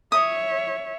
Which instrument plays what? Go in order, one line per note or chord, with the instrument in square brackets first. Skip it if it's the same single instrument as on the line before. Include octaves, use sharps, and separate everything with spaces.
[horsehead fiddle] C#5 E5 [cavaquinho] D#6